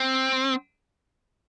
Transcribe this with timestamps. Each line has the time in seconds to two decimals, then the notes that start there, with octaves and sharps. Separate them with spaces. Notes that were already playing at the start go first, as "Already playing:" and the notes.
Already playing: C4